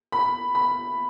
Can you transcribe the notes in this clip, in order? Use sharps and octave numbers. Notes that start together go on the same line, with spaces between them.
B5
B5